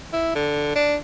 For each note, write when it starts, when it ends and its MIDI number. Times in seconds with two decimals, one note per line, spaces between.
0.13 0.32 64
0.36 0.72 50
0.76 0.96 62